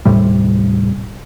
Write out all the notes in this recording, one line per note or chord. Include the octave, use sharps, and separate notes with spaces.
D#2 A2 C3 G3